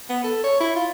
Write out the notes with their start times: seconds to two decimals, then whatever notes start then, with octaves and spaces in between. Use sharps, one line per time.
0.10 B3
0.24 A4
0.44 C#5
0.60 E4
0.76 F4